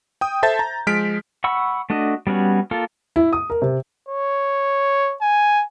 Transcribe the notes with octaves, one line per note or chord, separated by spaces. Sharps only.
G5 D#6
A4 C5 E5 A5 G6 A6
A#5
F3 G#3 F6 B6 D7
F#5 B5 C#6 E6
A3 D4 F#4 D#5
G3 B3 C#4 F#4
A#3 F4 A4
E4
D#6
A#4
C3
C#5
G#5